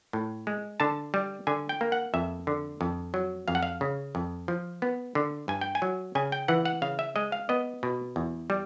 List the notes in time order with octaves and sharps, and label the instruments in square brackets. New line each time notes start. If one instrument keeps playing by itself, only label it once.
[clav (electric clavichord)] A2
G#3
D3 A5
G3
D3 G#5
G5
A#3
F#5
F2 E5
D3
F2
F#3
F2 F5
F#5
F5
C#3
F2
F3
B3
D3
G2 G#5
G5
G#5
F#3
C#3 G#5
G5
E3 F#5
F#5
C#3 F5
E5
G#3 D#5
F5
B3 D#5
B2
E2
G3